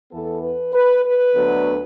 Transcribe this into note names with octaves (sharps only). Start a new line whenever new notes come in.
E2 E3 B3 A4
B4
B4
B4
D2 D3 F#3 B3